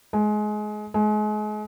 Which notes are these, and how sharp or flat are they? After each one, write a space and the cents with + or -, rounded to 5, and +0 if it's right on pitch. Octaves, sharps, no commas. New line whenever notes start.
G#3 +25
G#3 +35